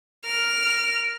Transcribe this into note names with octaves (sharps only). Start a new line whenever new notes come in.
A#4 F6